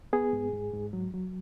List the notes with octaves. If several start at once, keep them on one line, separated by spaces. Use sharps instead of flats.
B3 G#4
G#2
G#2
G#2
F#3
F#3